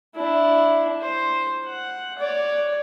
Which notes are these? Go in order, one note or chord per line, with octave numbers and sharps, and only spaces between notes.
D4 E4
C5
F#5
C#5 D5